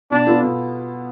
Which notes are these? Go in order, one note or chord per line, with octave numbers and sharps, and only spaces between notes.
B2 D4
B3 F4 A4
B2